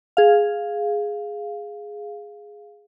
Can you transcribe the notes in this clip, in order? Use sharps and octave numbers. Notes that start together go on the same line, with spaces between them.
G#4 F5